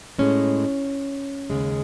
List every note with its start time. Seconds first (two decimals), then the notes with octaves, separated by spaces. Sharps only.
0.18 A2 G#3 C#4
1.50 D#2 C#3 G#3